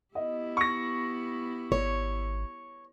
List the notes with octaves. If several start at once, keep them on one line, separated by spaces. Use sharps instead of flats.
B3 E4 G4 D#5
C#6 A#6
G#1 C#5